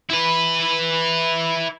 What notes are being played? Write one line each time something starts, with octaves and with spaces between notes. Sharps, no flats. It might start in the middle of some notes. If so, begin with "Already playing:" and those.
E4 B4